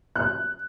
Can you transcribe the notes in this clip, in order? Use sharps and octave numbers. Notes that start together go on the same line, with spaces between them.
F#6